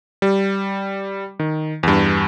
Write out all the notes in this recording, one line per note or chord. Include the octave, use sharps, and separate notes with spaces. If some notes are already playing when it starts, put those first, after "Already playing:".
G3
D#3
E2 G2